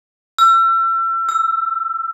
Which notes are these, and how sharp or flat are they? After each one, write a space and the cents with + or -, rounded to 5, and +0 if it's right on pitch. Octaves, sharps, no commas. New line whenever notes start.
E6 +35
E6 +10